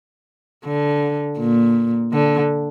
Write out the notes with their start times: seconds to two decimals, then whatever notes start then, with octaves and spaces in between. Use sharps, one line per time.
0.65 D3
1.39 A#2
2.13 D3